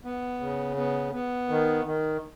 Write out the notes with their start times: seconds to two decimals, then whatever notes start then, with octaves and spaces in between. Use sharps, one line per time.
0.04 B3
0.41 C#3
0.77 B3
1.13 B3
1.49 D#3
1.85 D#3